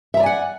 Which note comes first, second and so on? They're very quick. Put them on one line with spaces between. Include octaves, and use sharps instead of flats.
E5 A#5 D5 G#5 F#5